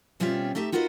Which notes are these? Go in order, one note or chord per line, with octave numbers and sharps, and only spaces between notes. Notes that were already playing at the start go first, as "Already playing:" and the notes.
B2 G3 C4 C#4 F4 E5
A3 D#4 G4 E5 A5
D#4 F4 F#4 A#4 B4 D#5